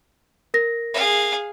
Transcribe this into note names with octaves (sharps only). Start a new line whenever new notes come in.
A#4 A#6
G#4 F5